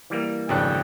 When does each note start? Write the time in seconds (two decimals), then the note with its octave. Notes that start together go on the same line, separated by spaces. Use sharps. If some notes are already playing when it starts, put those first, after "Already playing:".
0.10 E3 G3 A#3
0.49 G#1 F2 C#3 D4 F#4 G5 F#6